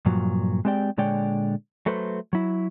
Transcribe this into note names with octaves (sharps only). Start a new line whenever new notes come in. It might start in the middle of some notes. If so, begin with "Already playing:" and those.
G2 A#2 F3 F#3
G#3 C4 G4 D5 G5
A#2 D3 G#3 C#5 D5 G5
F#3 A3 A4 B4 C5
F#3 E4